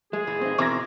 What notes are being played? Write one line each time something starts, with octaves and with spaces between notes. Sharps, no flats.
G#3 G#4
A#2 E3
C4 D#4
B2 E3 C4 A#4 D6 A#6